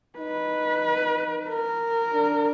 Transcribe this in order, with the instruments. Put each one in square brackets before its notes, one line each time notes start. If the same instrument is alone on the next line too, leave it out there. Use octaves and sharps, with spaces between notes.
[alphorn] D#4 [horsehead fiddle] B4
[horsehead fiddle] A#4
[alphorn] D4